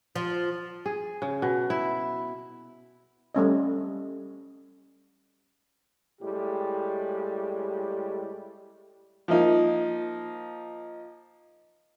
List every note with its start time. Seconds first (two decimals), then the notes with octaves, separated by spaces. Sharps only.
0.16 F3
0.86 G#4
1.22 C#3
1.42 B2
1.70 E4
3.35 G3 A3 C#4 D#5
6.21 A2 G3 G#3 G4
9.28 F3 A#3 D#4